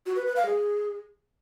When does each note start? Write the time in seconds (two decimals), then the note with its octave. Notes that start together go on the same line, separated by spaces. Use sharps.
0.06 F#4
0.16 B4
0.26 B4
0.36 F5
0.46 G#4